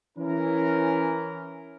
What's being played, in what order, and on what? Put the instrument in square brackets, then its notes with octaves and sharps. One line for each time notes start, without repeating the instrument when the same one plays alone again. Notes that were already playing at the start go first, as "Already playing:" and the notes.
[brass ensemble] E3 C#4 A#4